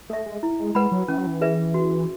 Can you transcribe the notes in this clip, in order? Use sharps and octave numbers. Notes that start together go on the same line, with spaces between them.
A3 A4 E5
G#3
E4
G#3
G#3 B4 F#5 B5
F#3
E3 C#4
F#3
E3
G#4 B4 E5
F#4